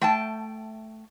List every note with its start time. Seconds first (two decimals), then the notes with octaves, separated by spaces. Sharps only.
0.01 A3 G5 A5